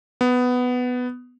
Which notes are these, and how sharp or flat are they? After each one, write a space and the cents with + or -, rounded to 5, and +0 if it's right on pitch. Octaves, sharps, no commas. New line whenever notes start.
B3 +10